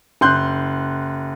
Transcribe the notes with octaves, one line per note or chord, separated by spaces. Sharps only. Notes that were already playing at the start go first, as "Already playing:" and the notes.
F#1 C6 F#6 G6